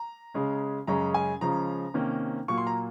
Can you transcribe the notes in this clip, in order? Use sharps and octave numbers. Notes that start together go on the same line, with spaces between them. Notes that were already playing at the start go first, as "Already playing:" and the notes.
Already playing: A#5
C#3 G#3 C#4
F#2 C#3 G#3 C#4 A#5
G#5
C#3 F3 G#3 C#4 A#5
C3 D#3 A#3 C#4
A#2 F#3 A#3 C#6
C6
A#5